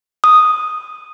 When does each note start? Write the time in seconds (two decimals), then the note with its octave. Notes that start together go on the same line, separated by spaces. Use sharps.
0.24 D#6